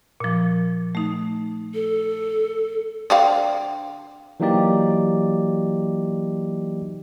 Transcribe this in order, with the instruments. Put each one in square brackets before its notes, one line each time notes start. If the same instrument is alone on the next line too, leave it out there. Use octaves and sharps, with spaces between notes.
[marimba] A#2 F3
A3 D#4
[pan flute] A4
[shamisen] D3 C4 F5
[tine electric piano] E3 F#3 A#3 D#4 G4 D5